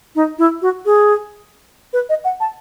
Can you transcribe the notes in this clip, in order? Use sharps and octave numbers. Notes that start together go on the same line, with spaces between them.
D#4
E4
F#4
G#4
B4
D#5
F#5
A5